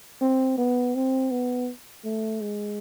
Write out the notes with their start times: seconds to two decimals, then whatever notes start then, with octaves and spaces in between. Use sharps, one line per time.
0.21 C4
0.58 B3
0.95 C4
1.31 B3
2.04 A3
2.41 G#3